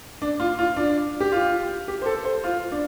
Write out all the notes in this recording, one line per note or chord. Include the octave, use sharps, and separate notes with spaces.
D4
F4
F4
D4
G4
F4
G4
C5
A4
C5
F4
D4